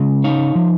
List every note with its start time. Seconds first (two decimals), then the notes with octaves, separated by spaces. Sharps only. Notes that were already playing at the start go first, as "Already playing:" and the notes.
Already playing: C#3 G#3
0.24 D#4 C#5 F5
0.55 F3